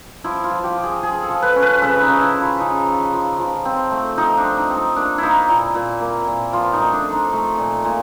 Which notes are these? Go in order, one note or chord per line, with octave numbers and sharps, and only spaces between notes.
F3 E4
F4
F3
G4
F3
G#4
F3 G#4
A4
F3
B4
C#4
B4
C#3 A4
D#4
C#3
E4
F3
F4
C#3 D#4
F3
F3
F3
C4
A3
F3 D#4
D4
C4
D#4
C4
D#4
A#3 D4
A#3 D#4 E4
A#2 E4
A#2
A#3
A#2
F3 F4
D#4
A3
D4
F3
D#4
A3
A#2
A#2